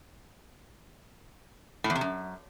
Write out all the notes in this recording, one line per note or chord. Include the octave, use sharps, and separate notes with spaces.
A2
E2
C3
F#2